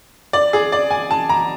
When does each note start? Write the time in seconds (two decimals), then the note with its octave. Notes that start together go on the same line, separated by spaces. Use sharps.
0.33 D5
0.53 G#4
0.72 D5
0.90 G#5
1.11 A5
1.29 A#5